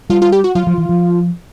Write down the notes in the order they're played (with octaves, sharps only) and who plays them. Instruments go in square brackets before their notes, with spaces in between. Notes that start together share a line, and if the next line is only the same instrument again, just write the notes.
[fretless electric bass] G3 [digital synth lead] F4
[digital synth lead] F4
G4
F#4
[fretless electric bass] F#3 [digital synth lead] F4
[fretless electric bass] F3
E3
F3